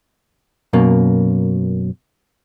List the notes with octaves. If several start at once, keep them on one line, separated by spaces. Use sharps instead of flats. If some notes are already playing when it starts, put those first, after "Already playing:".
F#2 B2 A#3